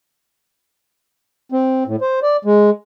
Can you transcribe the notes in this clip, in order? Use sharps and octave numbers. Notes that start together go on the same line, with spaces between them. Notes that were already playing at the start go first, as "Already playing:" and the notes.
C4
A2
C5
D5
G#3